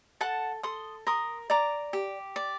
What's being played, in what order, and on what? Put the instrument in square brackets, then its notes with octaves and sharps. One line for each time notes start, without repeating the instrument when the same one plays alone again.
[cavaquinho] A4 F#5 A5
A4 C6 D#6
A#4 C6 D#6
D5 A#5 D6
G4
D5